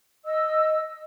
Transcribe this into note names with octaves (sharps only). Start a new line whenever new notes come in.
D#5 E6